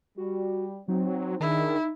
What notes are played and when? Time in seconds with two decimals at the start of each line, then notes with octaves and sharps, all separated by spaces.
0.17 G3 F#4
0.88 F#3 C4 D#4
1.40 D#3 D4 E4 G#4